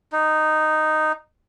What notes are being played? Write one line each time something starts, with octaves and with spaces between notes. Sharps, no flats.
D#4